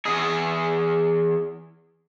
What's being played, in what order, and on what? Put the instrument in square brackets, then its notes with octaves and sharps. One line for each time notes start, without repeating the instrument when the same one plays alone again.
[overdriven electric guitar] E2 G#4